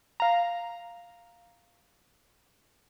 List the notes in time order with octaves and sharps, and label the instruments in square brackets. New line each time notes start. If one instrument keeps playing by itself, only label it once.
[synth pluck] F5 A#5